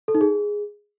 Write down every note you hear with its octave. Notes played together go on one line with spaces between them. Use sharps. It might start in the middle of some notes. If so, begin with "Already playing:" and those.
A4
D#4
G#4